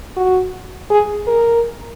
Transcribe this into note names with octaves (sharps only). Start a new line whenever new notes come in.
F#4
G#4
A#4